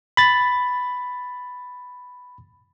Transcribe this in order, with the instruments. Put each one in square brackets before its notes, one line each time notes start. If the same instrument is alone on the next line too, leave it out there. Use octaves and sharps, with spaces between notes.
[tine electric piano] B5 A6